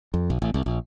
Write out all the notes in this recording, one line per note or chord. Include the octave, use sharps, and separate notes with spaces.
F2
B1
A1
C2
A#1